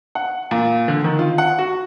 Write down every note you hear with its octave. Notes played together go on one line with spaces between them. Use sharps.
F#5
A#2
D3
D#3
F4
F#5
F#4